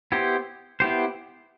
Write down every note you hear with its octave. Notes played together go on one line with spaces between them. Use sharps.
B3 E4 G4 C5
B3 E4 G4 C5